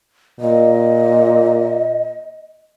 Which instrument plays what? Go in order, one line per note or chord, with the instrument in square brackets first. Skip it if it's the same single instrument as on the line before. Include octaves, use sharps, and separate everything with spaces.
[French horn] A#2 [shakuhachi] D#5